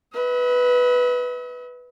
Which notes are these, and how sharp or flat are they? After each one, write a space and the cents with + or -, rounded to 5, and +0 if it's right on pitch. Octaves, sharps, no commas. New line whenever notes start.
B4 +0 E5 -45